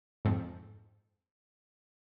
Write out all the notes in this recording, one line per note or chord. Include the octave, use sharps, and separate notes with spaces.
F2 G#2